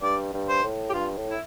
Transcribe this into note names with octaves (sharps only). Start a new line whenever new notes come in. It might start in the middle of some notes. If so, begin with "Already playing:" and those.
G2 D5
G2
C5
A2
G4
G2 F4
A2
E4